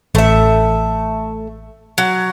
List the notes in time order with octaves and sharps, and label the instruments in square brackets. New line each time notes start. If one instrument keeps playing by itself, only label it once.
[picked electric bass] A1 [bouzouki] A3 E5
[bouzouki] F#3